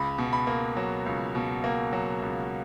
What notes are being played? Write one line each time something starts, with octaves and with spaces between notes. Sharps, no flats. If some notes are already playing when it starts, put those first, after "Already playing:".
Already playing: C#2 B5
B2
B5
A#3
F#3
C#2
B2
A#3
F#3
C#2